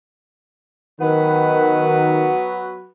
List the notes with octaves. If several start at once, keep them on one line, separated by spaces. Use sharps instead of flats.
D#3 F#3 B3 F#4 B4